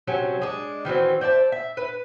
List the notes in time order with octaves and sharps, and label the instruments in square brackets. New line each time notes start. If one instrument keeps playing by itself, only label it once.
[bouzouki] C3 F#3 C#4 A4
G#3 D4
D#3 E3 F#3 C4
C5 D5 E5 A5
E5
B4